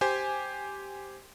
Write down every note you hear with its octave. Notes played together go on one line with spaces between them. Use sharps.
G4 C5 G#5